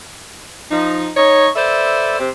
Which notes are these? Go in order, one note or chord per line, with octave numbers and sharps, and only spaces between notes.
F3 D#4
D#4 C#5
A4 B4 C5 D5 E5
C3 C4